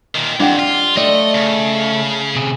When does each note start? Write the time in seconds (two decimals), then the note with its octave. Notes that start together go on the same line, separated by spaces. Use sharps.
0.15 A#2 D#3
0.40 F2 D4 G4 F#5
0.59 F4
0.97 A3 D5 D#5
1.35 C#3
2.36 C3 G#4